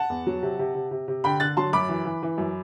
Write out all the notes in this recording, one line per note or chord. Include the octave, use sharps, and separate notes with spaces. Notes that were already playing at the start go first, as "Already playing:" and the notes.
Already playing: F#5 A5
E2
F#3
C3
C3
C3
C3
C3
D3 G5 B5
D3 F#6 A6
F#3 A5 C6
F#2 B5 D6
E3
E3
E3
F#2